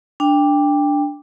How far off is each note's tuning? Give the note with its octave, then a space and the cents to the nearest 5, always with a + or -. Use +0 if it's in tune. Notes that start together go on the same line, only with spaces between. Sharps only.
D4 +0 G5 +20